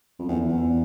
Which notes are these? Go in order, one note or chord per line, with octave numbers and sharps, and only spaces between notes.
F2
E2
E2